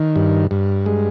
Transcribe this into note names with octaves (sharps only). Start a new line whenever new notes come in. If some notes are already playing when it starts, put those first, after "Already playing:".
Already playing: D#3
G2
G2
G#3